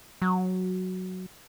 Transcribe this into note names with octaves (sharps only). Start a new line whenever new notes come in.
F#3